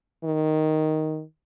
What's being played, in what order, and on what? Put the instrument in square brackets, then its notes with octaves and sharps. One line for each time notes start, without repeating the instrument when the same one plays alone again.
[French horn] D#3